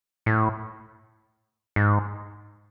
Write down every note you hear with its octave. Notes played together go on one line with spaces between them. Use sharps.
A2
G#2